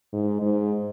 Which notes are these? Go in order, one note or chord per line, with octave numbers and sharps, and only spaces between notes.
G#2
G#2